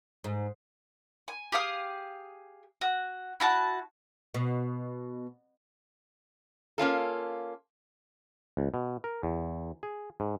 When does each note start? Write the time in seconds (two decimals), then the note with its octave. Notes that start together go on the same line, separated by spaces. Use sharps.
0.24 G#2
1.28 G#5
1.52 G4 G#4 F5 D#6
2.81 F#4
3.40 E4 F#4 A5
4.34 B2
6.78 A#3 C#4 F4 A4
8.57 C#2
8.74 B2
9.04 A#4
9.23 E2
9.83 G#4
10.20 G#2